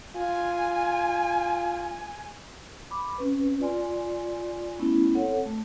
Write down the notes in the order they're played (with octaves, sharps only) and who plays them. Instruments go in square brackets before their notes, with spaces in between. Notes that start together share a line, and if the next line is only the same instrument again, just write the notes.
[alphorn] F4 [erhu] G#5
[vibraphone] B5 C6 D6
C4 C#4 B4
F4 D5 G#5 C6
A3 B3 C#4 E4
C4 A4 C#5 F#5
A3